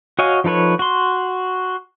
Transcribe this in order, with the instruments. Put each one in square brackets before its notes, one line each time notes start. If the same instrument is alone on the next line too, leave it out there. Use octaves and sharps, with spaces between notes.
[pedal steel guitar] F#4 C#5 D#5 F5 G#5
F3 D#4 A4 B4 C#5
F#4 C6